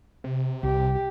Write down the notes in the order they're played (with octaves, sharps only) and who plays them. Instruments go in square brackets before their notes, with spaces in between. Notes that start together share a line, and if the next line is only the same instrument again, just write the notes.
[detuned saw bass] C3
[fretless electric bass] C2 [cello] G4